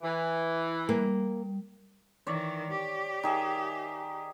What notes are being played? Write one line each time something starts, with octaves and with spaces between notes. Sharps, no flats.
E3
G3 A#3
D#3 E3 C#5 D5
G4
D#3 G#4 E5